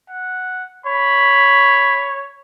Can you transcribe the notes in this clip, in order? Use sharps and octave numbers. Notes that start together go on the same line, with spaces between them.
F#5
C#5 B5